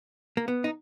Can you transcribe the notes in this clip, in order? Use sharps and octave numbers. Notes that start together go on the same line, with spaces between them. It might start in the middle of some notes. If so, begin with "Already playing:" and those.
A#3
B3
D#4